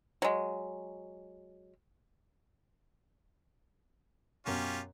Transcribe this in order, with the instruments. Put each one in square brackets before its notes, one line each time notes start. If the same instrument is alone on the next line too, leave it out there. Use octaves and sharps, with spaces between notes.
[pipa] F#3 G#3
[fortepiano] F#2 B2 [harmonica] C#4 F4 G4